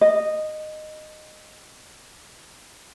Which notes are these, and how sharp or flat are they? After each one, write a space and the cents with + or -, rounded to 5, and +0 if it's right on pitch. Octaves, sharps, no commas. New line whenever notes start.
D#5 -10